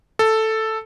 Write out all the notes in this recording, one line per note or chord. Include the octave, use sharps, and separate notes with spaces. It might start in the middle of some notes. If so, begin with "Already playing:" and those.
A4